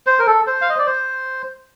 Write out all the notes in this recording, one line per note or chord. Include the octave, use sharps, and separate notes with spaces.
C5
A#4
A4
C5
F5
D#5
D5
C5